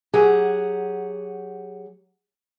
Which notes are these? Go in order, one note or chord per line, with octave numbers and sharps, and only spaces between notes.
F#3 G4 G#4 F#5 A#5